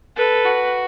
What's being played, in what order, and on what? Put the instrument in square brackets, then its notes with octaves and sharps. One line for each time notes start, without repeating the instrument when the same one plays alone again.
[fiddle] A4 [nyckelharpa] B4
[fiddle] F#4